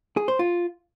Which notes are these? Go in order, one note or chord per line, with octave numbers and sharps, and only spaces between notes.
G#4
C5
F4